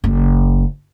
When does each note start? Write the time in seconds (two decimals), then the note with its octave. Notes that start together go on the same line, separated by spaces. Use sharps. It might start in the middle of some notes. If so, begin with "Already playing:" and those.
0.04 F#1